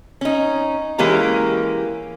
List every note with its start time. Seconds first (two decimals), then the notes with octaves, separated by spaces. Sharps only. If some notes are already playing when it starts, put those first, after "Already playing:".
0.21 C#4 D#4
0.98 E3 G#3 A#3 C#4 G4 A#5